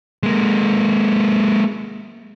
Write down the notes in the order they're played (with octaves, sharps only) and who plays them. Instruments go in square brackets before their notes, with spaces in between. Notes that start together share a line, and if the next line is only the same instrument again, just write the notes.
[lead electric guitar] G#3 A#3